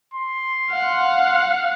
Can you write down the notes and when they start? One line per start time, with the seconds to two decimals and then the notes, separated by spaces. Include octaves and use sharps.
0.14 C6
0.70 F5 F#5